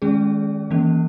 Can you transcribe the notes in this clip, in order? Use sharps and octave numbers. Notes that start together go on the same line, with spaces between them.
D#3 G#3 C#4 G#4
E3 A#3 C#4